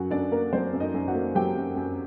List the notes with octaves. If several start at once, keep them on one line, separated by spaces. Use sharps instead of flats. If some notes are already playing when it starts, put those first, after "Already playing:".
Already playing: F#2 F#3 F#4 F#5
F#2 D4 D5
A#3 A#4
F#3 C4 C5
F#2
D#4 D#5
F#2
F#4 F#5
A#3
F#3 G4 G5
F#2
F#2